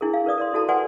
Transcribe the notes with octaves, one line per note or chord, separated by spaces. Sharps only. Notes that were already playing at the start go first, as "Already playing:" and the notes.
D4 E4 G#4 A#4
F5
A#4 B4 D5 D#6
A#4 D5 C6
E4 F#4 A4 A5
A#4 B4 D5 F#5 G#5 C6